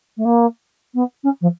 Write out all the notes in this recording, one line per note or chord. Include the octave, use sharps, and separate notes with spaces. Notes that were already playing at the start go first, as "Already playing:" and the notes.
A3
A#3
B3
C#4
F3